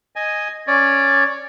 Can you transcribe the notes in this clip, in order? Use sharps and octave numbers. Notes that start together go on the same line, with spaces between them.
D#5 G#5
C#4 C#5 D5